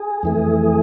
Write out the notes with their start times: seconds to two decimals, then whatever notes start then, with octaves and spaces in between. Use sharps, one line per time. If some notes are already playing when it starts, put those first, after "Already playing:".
Already playing: G#4
0.23 F2 E3 A3